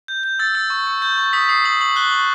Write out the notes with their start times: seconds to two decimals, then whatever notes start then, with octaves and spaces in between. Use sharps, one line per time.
0.08 G6
0.23 G6
0.39 E6 A6
0.55 E6
0.70 C#6
0.87 E6
1.02 G6
1.18 C#6
1.33 D#6 B6
1.49 D#6 C7
1.64 D#6 F#7
1.80 C#6 F#7
1.96 F#6 G7
2.11 C#6 F#7